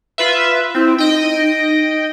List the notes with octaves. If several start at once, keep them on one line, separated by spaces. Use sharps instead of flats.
F4 B4 E5
C4 E4
D#4 D#5 G5